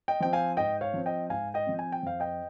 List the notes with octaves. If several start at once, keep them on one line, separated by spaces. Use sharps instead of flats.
D#5 G5
F3 C4 G5
F5 G#5
G#2 D#5 G5
C#5 F5
F3 C4
D#5 G5
G#2 F5 G#5
D#5 G5
F3 C4
G#5
G5
F2 F5
D#5 G5